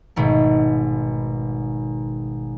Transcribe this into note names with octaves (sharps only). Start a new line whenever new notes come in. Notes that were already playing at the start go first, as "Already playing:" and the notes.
G#1 B2 D#3 A3